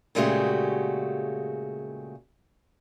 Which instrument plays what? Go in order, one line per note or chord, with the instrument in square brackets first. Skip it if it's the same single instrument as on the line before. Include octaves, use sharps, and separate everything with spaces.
[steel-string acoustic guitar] A#2 C#3 G#3 A3 F#4 G4